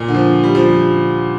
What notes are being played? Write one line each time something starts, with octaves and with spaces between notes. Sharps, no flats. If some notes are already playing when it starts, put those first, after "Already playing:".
Already playing: A#2
D3
F3
G3
F3
G3